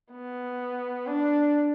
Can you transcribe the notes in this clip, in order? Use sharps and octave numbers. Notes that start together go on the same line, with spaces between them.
B3
D4